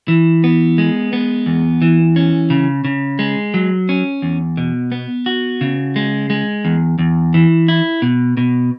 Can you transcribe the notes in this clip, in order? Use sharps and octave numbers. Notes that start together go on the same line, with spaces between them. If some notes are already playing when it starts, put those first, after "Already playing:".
E3
B3
G#3
B3
E2
E3
C#4
C#3
C#3
G#3
F#3
C#4
E2
B2
B3
F#4
C#3
G#3
G#3
E2
E2
E3
E4
B2
B2